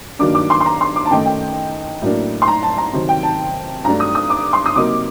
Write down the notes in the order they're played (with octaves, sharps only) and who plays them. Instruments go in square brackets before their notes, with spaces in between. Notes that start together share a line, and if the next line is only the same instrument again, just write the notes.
[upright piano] G2 D#3 F#3 A#3 D4 D6
D6
C6
C6
A#5
C6
D6
A5
F#2 D#3 A3 D#4 G5
G5
A2 F#3 A#3 D4
C6
A#5
A5
A#5
C3 D#3 F#3 C4
G5
A5
G2 F#3 A3 D4 A#5
D#6
D#6
D6
C6
D#6
C3 F#3 A#3 D#4 D6